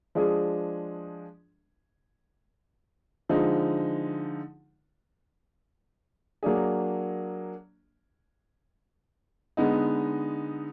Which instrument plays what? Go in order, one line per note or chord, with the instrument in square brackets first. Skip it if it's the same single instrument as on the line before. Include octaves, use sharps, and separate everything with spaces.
[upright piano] F3 G#3 D4 G#4
D3 F3 G#3 D#4
F#3 A#3 D4 G#4
D3 G#3 B3 D#4